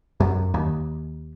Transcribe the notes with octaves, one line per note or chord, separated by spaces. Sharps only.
F#2
D#2